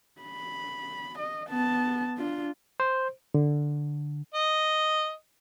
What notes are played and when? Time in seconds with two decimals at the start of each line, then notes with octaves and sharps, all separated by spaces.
0.21 B5
1.19 D#5
1.48 B3 A5
2.17 D4 F4
2.80 C5
3.34 D3
4.34 D#5